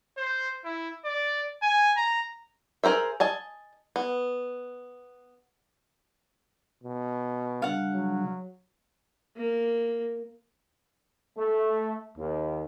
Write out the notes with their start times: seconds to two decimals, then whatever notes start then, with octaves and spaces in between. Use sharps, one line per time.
0.18 C5
0.64 E4
1.05 D5
1.62 G#5
1.97 A#5
2.84 G#4 A#4 C5 E5
3.20 D#5 G#5 A5
3.96 B3
6.83 B2
7.62 C#3 G3 D4 F5 F#5
7.93 F#3
9.37 A#3
11.37 A3
12.17 D#2